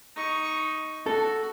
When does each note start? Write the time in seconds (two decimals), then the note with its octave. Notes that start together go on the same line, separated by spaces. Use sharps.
0.16 D#4 C#6
1.06 F#4 A4